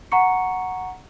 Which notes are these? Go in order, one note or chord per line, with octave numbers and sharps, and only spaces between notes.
F#5 A#5 C#6 C#7